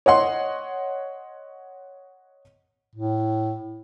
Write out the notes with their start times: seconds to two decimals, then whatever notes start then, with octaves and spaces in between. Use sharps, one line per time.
0.06 C#5 D#5 F#5 C6
2.95 A2